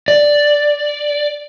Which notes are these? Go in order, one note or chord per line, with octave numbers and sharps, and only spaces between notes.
D5